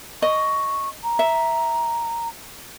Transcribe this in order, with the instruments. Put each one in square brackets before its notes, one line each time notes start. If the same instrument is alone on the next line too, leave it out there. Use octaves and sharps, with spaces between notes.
[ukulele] D#5 [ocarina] C#6
[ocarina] A#5
[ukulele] E5